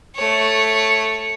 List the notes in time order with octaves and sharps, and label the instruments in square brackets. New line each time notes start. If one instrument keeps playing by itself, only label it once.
[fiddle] A3 C#5